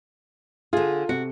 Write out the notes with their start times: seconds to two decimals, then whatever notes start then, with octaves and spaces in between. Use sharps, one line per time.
0.73 D3 F4 G#4
1.09 C3 F#4 C#7